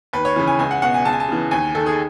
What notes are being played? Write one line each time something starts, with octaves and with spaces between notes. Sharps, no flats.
D#2 B4
C#5
C#3 E3
G#5
C#2 G#5
F#5
B2 F#5
G#5
C#2 A5
G#5
A5
C#3 E3
D#2 G#5
D#3 A4
G#4